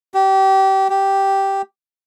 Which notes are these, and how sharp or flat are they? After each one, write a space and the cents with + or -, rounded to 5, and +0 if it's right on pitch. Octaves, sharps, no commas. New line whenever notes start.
G4 -25
G4 -5